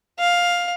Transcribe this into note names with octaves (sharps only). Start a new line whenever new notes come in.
F5